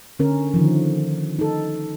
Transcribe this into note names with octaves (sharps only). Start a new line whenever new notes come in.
D3 C#4 A#4
D3 D#3 F3
D#4 A4